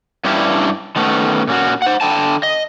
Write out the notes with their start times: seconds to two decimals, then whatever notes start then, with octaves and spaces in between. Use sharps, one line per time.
0.24 G2 C#4 D4 E4 G4
0.96 D#3 A3 B3 C#4
1.47 A#2 C#4 F#4
1.82 C5 F#5
2.01 D3 G5 A5
2.43 D#5